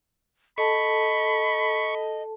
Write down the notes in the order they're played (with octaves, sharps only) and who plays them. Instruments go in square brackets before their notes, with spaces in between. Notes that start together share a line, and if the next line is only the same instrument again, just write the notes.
[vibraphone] A4 A5 [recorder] D#5 [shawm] B5 [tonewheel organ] C#6